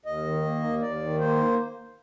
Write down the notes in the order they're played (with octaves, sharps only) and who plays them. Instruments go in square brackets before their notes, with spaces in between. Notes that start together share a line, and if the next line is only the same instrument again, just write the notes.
[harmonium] D#2 D#5
D#3
A#3
D#2
D#2 D5
D#3
A#3 C5